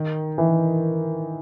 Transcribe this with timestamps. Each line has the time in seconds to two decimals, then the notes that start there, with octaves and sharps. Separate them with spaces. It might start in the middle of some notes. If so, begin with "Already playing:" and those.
Already playing: D#3
0.38 E3